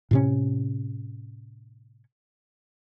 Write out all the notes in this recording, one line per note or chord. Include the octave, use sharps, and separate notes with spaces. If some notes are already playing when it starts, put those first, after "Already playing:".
A2 C3 C#4